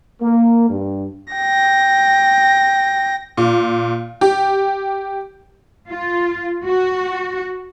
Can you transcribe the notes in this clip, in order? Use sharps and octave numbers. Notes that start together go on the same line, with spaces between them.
A#3
G2
G5 A#6
A#2
G4
F4
F#4